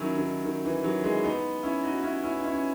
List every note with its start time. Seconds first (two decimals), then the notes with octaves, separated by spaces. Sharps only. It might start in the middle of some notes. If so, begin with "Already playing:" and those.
Already playing: D#3 F#3 C#4 E4
0.18 D#3
0.45 D#3
0.65 E3
0.84 D#3 F#3
1.04 E3 G#3
1.24 B3 D#4
1.63 C#4 E4
1.83 D#4 F#4
2.03 C#4 E4
2.23 C#4 E4
2.36 D#4
2.43 C#4 E4
2.53 C#4